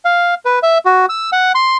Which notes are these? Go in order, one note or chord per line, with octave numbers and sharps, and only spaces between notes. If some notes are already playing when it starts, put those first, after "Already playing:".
F5
B4
E5
F#4
E6
F#5
C6